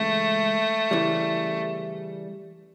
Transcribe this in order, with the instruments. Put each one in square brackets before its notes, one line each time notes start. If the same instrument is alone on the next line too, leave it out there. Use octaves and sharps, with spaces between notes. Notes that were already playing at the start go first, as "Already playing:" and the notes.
Already playing: [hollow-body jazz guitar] C#2 C#3 E3 [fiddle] A3
[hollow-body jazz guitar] C#3 E3 G3